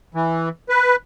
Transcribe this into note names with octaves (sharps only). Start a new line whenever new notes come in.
E3
B4